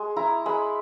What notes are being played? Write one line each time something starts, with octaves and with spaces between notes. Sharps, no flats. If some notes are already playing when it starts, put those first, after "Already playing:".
Already playing: G#3
E4 A#5
G#3 B5